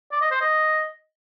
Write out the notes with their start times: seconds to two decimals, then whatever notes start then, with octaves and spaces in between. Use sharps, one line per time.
0.12 D5
0.21 D#5
0.31 C5
0.41 D#5